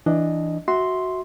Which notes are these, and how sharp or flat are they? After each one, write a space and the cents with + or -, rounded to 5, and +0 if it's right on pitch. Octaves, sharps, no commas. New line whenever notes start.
E3 +0 D4 +10 D#5 +0
F#4 +0 E5 -20 C6 +0